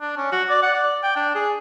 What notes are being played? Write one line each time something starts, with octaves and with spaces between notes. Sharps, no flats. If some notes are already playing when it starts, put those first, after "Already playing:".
D4
C#4
F#4
D5
F#5
D5
G5
D4
G#4